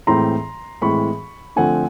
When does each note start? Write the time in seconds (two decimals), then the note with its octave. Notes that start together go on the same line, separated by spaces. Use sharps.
0.07 A2 E3 G#3 C4 A#5 C6
0.82 A2 E3 G#3 C4 B5 C#6
1.56 D3 F3 A3 C4 F#5 G#5